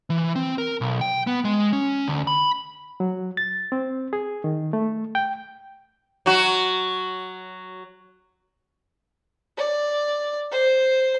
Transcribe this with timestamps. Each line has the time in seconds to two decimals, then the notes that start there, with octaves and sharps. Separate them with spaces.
0.10 E3
0.36 C4
0.58 A#4
0.81 B1
1.01 G5
1.27 B3
1.45 G#3
1.73 C#4
2.08 D2
2.27 B5
3.00 F#3
3.37 A6
3.72 C4
4.13 G#4
4.44 D#3
4.73 A3
5.15 G5
6.26 F#3 F#4
9.57 D5
10.51 C5